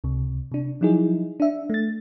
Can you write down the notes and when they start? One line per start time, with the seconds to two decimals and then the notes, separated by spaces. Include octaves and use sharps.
0.04 C#2 C3
0.52 C3 D4
0.81 F3 F#3 D#4 E4 G#4
1.40 D4 E5
1.70 A3 A6